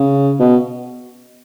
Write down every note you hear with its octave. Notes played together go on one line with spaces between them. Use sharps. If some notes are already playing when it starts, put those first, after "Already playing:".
Already playing: C#3
B2